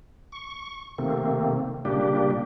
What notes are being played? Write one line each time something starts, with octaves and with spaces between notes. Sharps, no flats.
C#6
C3 D#3 A3 A#3 C4
A#2 C#3 G3 A#3 D4 G4